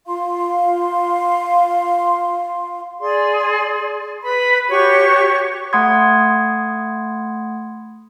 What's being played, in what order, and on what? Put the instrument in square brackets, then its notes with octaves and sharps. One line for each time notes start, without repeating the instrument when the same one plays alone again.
[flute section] F4 F5 C6
G#4 D5 C6
B4 B5
F#4 G4 C#5 C#6
[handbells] A3 F#5 B5 C6 D#6 G#6